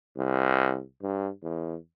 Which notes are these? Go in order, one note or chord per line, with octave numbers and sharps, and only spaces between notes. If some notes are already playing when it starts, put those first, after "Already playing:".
C2
G2
E2